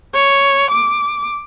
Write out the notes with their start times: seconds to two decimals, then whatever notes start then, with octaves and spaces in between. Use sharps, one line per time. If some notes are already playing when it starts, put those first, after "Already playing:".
0.14 C#5
0.71 D6